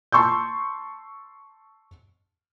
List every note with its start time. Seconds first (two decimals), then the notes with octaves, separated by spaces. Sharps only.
0.12 A5 C6 C#6 E6 G6